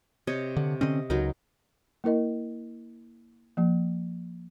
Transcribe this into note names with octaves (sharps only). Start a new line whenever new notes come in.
C3 C#5 D#5
D3
D3 C4 C#4 D#5
C#2 F#3 D#4 A#4
A#3 E4 A#4 D#5
F3 A#3